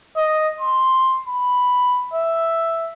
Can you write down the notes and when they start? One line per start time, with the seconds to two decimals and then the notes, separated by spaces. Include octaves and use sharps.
0.17 D#5
0.61 C6
1.28 B5
2.14 E5